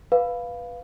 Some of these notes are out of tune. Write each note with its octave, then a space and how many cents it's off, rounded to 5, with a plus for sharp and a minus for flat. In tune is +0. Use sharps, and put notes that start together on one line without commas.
B4 +0 F5 +0